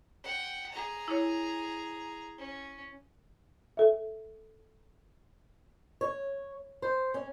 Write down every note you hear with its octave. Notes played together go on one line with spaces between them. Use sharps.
F#5 G5
G#4 A#5
E4 C#5
C#4
A4 E5
C#5
C5
C#4